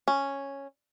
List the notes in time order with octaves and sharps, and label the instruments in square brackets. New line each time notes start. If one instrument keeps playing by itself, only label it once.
[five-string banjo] C#4